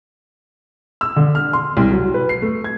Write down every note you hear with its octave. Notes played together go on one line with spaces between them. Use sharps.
E6
D3
F6
C6
C2
F#3
B4
C7
A3
G#6